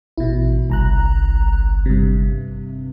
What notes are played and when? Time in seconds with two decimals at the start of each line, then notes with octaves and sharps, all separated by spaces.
0.18 A1 B2 E4
0.70 G1 C2 A#5 F#6
1.86 G2 C3